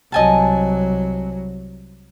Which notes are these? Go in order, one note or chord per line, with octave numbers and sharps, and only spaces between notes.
C2 F#3 D#5 G#5 A5